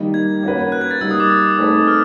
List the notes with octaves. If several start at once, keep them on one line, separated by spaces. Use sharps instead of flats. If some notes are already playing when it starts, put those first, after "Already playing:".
Already playing: D#3 G3 A#3 D#4 G4
G#6
A#3 C#4 F#4 B4
F#6
G#6
A6
G3 A#3 D#4 E6
D#6
D6
E6
A3 C4 D#4 G#4 B4
F6